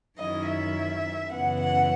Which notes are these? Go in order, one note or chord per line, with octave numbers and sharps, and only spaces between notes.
F#2 D#3 F#3 C#4 E4 D#5
E5
F#2 C#3 E3 B3 E4 F#5
F#5